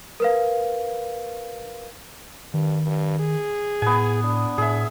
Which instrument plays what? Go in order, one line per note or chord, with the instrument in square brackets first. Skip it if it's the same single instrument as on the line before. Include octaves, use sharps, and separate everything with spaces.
[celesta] A#4 B4 F5
[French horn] G2 [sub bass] D#3
[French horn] G2
G#4
[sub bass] A2 [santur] B3 G#5
[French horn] D4
[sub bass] A2 [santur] G#4 E5